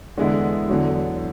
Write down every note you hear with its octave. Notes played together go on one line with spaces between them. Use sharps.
E2 D3 G#3 B3 E4
E2 D3 F#3